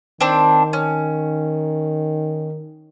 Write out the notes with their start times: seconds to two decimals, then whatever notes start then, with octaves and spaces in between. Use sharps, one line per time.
0.21 D#3 C4 D4
0.73 C#4